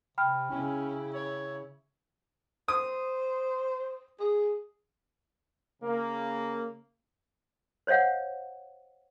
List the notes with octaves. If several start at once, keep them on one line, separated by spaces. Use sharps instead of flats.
C3 G5 B5 F6
C#3 C#4 E4
C#5
C5 D#6
G#4
C#3 A#3
C5 C#5 D#5 F5 F#5